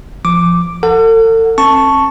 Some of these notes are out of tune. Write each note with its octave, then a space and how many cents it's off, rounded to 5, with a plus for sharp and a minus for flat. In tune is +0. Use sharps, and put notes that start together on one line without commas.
F3 -10 D6 +0
A4 +40 F#5 -15
C4 +45 A5 +0 C#6 +0